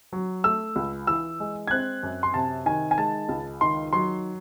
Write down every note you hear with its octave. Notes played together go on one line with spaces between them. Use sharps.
F#3
A3 E6
C#2
E3 E6
G#3
G#6
C4 F#6
F#2
C6
C3 A5
D#3 G#5
G#5
G#3 A5
C#2
D#3 C6
F#3 C6